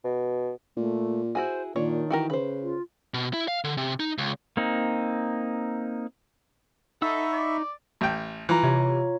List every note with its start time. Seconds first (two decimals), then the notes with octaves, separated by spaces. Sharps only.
0.04 B2
0.77 A#2 A3
1.35 E4 F#4 G#4 C5
1.76 A#2 D#3 D4 C#5
2.10 E3 F#4 G4 A#4
2.30 C#3 B4 C5
2.62 F4
3.14 B2
3.34 E4
3.48 F5
3.64 D3
3.77 C3
4.00 D#4
4.18 C#2
4.57 A#3 C4 D#4
7.02 D#4 A4 E5 F#5 B5 C#6 E6
7.32 D5
8.01 A1 G5
8.49 E3 F4 A#5
8.63 C3 C#5